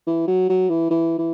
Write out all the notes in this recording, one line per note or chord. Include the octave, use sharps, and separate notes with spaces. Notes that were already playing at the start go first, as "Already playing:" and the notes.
E3
F#3
F#3
E3
E3
E3